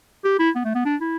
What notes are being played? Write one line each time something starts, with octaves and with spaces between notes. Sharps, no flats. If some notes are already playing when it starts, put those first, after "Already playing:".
G4
E4
B3
A3
B3
D4
E4